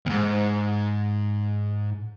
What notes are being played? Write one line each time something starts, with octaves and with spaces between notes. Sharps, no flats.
D#2 G#2